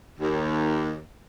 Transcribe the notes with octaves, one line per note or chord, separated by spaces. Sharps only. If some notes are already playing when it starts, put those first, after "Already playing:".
D#2